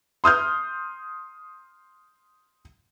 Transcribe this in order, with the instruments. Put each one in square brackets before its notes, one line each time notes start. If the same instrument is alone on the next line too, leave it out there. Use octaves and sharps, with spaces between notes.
[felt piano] C6 D#6 F6 G6